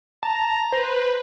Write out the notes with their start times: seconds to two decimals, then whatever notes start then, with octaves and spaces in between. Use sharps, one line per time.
0.23 A5 A#5
0.72 B4 C5